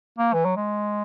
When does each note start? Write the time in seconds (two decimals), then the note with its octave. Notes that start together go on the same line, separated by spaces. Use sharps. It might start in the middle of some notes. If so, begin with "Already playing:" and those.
0.18 A#3
0.33 E3
0.45 F#3
0.56 G#3